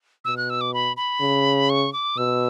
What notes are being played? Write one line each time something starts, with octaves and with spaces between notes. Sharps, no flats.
B2 E6
F#6
E6
D6
B5
B5
C#3
C#6
D6
B2 E6